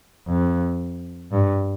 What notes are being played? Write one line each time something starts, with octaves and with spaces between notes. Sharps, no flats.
F2
G2